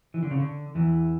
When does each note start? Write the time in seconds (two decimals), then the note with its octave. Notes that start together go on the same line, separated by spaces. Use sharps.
0.14 E3
0.23 D3
0.31 C#3
0.40 D3
0.75 E2 E3